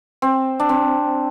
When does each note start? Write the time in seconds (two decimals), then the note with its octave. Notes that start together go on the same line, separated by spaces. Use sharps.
0.22 C4
0.60 D4
0.69 C4